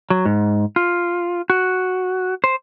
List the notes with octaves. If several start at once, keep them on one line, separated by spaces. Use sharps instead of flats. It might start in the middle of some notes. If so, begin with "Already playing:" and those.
F#3
G#2
F4
F#4
C5